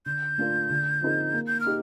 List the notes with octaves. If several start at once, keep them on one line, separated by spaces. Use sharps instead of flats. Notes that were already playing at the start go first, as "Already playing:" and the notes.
D3 G6
A3 D4 F4 A#4
D3
F3 C4 D#4 A#4
A#3
G6
F6
D#4 G4